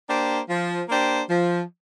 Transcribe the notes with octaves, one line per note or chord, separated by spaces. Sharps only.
A#3 D4 G4 C5
F3
A#3 D4 G4 C5
F3